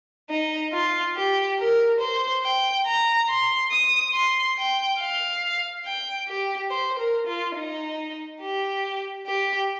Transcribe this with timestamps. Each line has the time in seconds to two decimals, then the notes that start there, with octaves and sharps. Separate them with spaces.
0.30 D#4
0.73 F4
1.16 G4
1.59 A#4
2.00 C5
2.43 G5
2.86 A#5
3.29 C6
3.71 D#6
4.13 C6
4.57 G5
5.00 F5
5.85 G5
6.27 G4
6.71 C5
6.99 A#4
7.27 F4
7.56 D#4
8.41 G4
9.26 G4